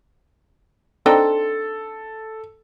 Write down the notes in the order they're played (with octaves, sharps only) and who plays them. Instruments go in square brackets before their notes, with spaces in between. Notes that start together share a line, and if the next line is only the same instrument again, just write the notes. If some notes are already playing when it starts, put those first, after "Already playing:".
[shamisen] C4 D4 D#4 [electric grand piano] A4